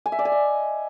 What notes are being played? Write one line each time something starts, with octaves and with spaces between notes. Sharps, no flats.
G#5
E5
D5
G#5
D#5